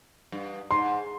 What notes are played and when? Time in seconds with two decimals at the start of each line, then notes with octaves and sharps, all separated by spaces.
0.32 G2
0.71 G#2 C6